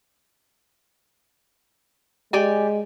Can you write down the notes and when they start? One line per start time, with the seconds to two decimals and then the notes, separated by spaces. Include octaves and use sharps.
2.33 G#3 G4 D5 G#5